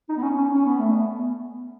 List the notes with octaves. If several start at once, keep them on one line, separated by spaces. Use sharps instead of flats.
D#4
B3
C#4
C#4
C#4
B3
A3
B3